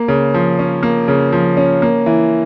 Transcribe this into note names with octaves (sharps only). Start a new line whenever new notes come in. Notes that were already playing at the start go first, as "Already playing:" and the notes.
Already playing: A#3
C#3
F3
C#4
A#3
C#3
F3
C#4
A#3
E3